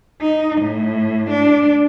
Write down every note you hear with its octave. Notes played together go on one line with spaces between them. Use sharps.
D#4
A2
D4